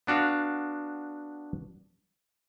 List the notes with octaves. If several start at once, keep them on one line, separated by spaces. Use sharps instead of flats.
B3 D4 F#4 F5